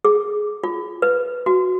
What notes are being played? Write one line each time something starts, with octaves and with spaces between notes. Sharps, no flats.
G#4
F4
B4
F#4